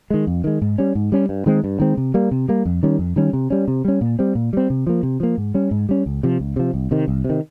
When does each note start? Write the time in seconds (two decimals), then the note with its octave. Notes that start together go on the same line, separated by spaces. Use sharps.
0.10 D#3 G#3
0.27 F2
0.44 D#3 G#3
0.62 G#2
0.78 G3 C#4
0.95 G#2
1.12 G3 C#4
1.29 G2
1.46 D#3 G#3 C4
1.64 G2
1.80 D#3 G#3 C4
1.97 C3
2.14 G3 A#3
2.31 C3
2.48 G3 A#3
2.66 F2
2.83 D#3 G3 C#4
2.99 F2
3.16 D#3 G3 C#4
3.33 C3
3.50 G3 C#4
3.68 C3
3.85 G3 C#4
4.01 A#2
4.19 G3 C4
4.35 A#2
4.53 G3 C4
4.70 C3
4.87 F3 A#3
5.03 C3
5.20 F3 A#3
5.38 G#2
5.54 G3 C#4
5.71 G#2
5.89 G3 C#4
6.06 C#2
6.23 C3 F3
6.40 C#2
6.56 C3 F3
6.74 C2
6.91 C3 D#3
7.08 C2
7.24 C3
7.30 D#3